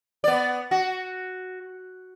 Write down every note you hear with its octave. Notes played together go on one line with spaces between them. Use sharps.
B3 D5
F#4